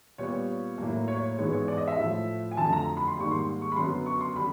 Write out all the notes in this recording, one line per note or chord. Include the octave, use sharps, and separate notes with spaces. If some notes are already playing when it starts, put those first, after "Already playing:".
A#2 G3 B3 C#5
A2 F#3 A#3
C#5
G#2 E3 G#3 B3 C#5
C#5
D5
D#5
E5
A2 F3 A3
G#5
F2 D3 F#3 A3 A5
A#5
B5
C6
G#2 D#3 G3 A#3 C#6
C6
C#6
B5
F#2 D3 F#3 B3 C6
C#6
C6
D3 G3 B5